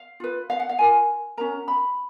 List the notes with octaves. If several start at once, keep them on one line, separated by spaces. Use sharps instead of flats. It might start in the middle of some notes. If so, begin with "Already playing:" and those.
Already playing: F5
F4 B4
F5
F#5
F5
F4 A#4 G#5
C#4 F#4 A#4 A#5
B5